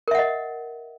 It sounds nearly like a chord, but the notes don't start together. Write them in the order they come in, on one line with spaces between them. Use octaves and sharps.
A#4 E5 F#5 D#5